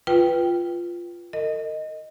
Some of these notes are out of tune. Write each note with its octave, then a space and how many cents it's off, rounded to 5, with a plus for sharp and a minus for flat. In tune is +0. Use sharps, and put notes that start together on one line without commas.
F4 -5 B4 +0 G5 +0
A#4 -40 D#5 +0